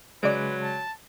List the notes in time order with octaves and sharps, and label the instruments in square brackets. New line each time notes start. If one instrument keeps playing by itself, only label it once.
[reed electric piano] C#3 G#3 [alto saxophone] F#3 [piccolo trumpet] B4 [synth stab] D5 D7
[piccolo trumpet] A5